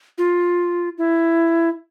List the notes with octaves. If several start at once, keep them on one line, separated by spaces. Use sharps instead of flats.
F4
E4